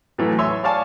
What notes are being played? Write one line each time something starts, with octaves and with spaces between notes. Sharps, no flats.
A2 E3 F#3 A3
C#5 E5 G#5 C6 E6
C#5 D5 F5 G#5 A5 C#6